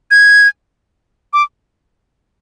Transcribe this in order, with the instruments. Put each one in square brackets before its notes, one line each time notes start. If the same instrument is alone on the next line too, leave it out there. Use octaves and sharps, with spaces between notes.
[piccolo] G#6
D6